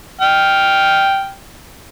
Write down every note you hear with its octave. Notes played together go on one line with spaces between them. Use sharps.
G5 F6